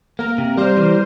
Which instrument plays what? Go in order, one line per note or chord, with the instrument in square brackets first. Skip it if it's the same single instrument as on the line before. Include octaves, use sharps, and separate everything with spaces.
[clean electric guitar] A#3 [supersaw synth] A#4
[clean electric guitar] C3
[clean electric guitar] G3 [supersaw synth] C5
[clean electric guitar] E3